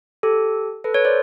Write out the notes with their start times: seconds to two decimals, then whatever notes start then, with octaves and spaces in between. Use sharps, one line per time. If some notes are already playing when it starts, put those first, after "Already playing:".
0.23 G4 A4
0.84 A4 B4
0.94 B4 C#5
1.05 C5 D5